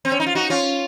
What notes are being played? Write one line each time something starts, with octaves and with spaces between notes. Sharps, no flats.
C4
C#4
D#4
F4
D#4 F#4
C#4 F4